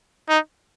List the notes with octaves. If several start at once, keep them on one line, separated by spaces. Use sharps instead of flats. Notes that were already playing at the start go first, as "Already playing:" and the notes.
D#4